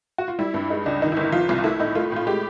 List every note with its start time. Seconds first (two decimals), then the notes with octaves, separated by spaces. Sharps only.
0.18 F#4
0.28 F4
0.39 G3 E4
0.54 G2
0.70 G#3 D#4
0.86 C#2 D4
1.02 D#3 D#4
1.12 E4
1.17 G1
1.23 E4
1.32 F3 F4
1.49 C2
1.58 F4
1.64 A3 E4
1.80 A2 D#4
1.95 A3 F4
2.12 A2 F4
2.27 G#3 G4